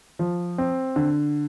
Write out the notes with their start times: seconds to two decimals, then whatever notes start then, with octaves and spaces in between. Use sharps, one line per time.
0.19 F3
0.58 C4
0.96 D3